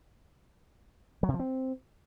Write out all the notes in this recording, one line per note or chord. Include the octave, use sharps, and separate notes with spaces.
F#3
C3
F3
C4